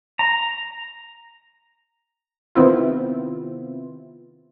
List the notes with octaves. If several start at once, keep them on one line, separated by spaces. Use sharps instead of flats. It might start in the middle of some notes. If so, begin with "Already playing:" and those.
A#5
C3 D#3 B3 C4 E4 F4